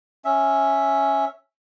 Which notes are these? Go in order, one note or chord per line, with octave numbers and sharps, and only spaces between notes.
C#4 E5